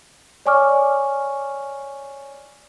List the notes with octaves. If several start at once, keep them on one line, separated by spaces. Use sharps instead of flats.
C#5 D5 G#5 C#6 D6 F6